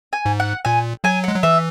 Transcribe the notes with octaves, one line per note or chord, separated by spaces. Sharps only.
G#5
G#2
F#5
A#2 G#5
F#3 G#5
G#3 F#5
F#3
E3 E5